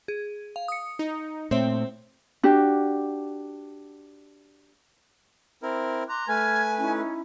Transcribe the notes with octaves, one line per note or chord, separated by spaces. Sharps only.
G#4
F5
D#6 C#7
D#4
A#2 A3 C4 C5 C#5 E5
D4 F#4 G4
C4 E4 A#4
A#5 C6 D6 F#6
A3 B4 G#5 F6 G#6
C#4 D#4 E4